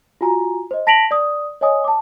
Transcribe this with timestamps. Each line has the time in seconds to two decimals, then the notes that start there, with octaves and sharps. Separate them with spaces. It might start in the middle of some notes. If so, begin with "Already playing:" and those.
0.21 F4 F#4 G#5 A#5
0.71 C5 D#5
0.87 A5 A#6 B6 D7 F7 F#7
1.11 D5 D#6
1.61 C#5 D#5 G#5 D#6
1.84 A5 D6